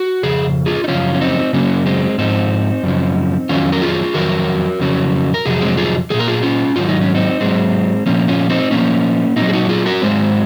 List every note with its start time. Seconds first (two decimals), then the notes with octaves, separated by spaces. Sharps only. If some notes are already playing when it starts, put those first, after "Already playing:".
Already playing: F#4
0.23 F2 C#3 G#4
0.66 F4 G#4
0.84 D#4
0.88 F#2 C#3 F3 C#4 F4
1.14 C#4
1.21 C4 D#4
1.53 F#2 C#3 F#3 A#3 C#4
1.86 G#3 C4
2.18 G#2 F3 C4 D#4
2.83 F#2 C#3 F3
3.49 F2 D#3 F#3 C#4 F4
3.72 A#4
3.82 F4 G#4
4.14 F2 D#3 F#3 F#4 A#4
4.80 F2 C#3 F#3
5.34 A#4
5.46 F2 C3 F#3 G#4
5.61 G#3 C4
5.77 F4 G#4
6.10 F3 G#4
6.14 A#2
6.19 A#4
6.27 F4 G#4
6.43 C#4 F4
6.75 G#2 D#3 F#3 F4
6.88 D#4
7.01 C#4
7.15 C4 D#4
7.41 G#2 F#3 G#3 C4
8.06 A#2 F3 A#3 C#4
8.28 C#4 F4
8.50 C4 D#4
8.71 A#2 F3 A#3 C#4
9.36 A#2 F#3 C4 D#4
9.48 G#4
9.53 D#4 F#4
9.69 F4 G#4
9.86 F#4 A#4
10.02 G#2 F#3 G#3 C4